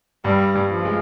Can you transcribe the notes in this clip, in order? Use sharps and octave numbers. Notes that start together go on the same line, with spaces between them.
G2 G3
G2
F3
G#3